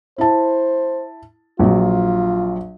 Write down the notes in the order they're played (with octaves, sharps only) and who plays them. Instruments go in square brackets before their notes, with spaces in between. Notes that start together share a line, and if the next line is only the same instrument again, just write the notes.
[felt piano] E4 A5 [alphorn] C5
[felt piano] A#1 F#3 [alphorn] F4